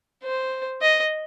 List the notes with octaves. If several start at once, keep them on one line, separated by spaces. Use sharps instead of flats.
C5
D#5